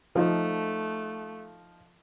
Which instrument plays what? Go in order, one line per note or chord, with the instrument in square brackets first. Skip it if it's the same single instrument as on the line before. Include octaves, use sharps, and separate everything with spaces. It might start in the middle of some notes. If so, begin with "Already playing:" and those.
[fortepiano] F3 D#4 F4 [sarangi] A3